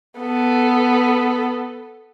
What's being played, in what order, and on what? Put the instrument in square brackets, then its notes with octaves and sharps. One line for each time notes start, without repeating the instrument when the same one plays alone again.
[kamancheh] B3 A4